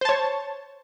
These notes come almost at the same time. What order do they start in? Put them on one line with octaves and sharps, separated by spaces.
C5 A5 C#5